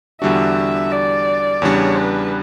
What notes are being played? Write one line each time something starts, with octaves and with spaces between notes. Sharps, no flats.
E2 D3 G3 D4 F#4 E5
D5
E2 C#3 G3 D4 C#5
B4